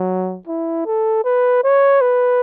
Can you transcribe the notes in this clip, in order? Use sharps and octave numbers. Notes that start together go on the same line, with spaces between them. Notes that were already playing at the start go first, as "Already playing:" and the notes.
Already playing: F#3
E4
A4
B4
C#5
B4